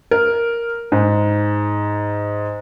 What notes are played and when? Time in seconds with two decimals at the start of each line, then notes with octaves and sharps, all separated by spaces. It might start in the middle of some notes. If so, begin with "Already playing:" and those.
0.11 A#4
0.92 G#2